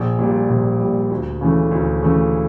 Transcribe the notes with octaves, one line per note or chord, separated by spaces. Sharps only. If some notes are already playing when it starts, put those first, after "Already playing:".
Already playing: A#1
A#2 G3
A#1
A#2 G3
D2
C#3 E3 A3
D2
C#3 E3 A3